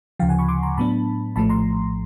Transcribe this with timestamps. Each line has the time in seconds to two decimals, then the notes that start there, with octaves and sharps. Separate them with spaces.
0.19 D2 C#3 F3 F5 G5
0.29 F#5 G#5
0.39 B5 C#6
0.48 C6 D6
0.63 A#5 C6
0.77 A2 F#3 B3 D4 A5 B5
1.36 A#1 A2 F3 A3 A5 B5
1.49 A#5 C6